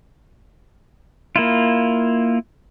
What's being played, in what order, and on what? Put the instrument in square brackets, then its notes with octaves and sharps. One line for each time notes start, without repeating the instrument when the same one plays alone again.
[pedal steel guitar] A#3 E4 F4